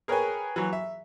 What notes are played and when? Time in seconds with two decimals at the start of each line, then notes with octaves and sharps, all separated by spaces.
0.08 G#4 A#4 B4 C#5 G5 G#5
0.56 E3 F#3
0.73 E5